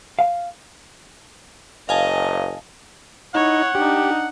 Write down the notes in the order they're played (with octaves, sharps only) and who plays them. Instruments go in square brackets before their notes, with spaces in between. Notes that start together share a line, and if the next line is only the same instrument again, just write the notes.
[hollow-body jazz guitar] F5
[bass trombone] F#1 [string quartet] D#5 [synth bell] F5 G#5 A5
[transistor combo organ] D#4 [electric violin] E4 C#5 [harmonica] F#5
[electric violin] D4 D#4 [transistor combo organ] G4